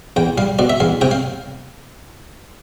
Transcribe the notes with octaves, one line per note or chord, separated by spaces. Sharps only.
E2 G5
G3 F5
B2 D5
E5
E2 F5
C3 G5
F5